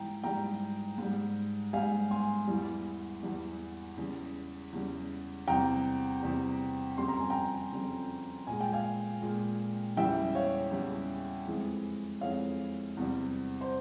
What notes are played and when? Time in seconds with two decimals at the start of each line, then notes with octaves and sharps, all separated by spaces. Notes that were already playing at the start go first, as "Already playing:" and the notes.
Already playing: G#2 E3 G3 G5 A#5
0.23 G#2 E3 G3 G5 A#5
0.98 G#2 G3
1.73 G#2 G3 F5 G#5
2.11 G#5 C6
2.47 E2 E3 G3
3.23 E2 E3 G3
3.97 E2 C#3 G3
4.73 E2 C#3 G3
5.48 E2 C3 G3 G5 A#5
6.22 E2 C3 G3
6.98 F2 C#3 G3 C6
7.08 A#5
7.20 G#5
7.30 G5 A#5
7.72 F2 C#3 G3
8.47 A#2 G#3 G#5
8.61 G5
8.73 F5 G#5
9.22 A#2 G#3
9.97 E2 C#3 E3 G3 E5 G5
10.35 C#5 F5
10.72 E2 C#3 E3 G3
11.47 F2 E3 G#3
12.21 F2 E3 G#3 C#5 F5
12.97 E2 C3 G3
13.61 C5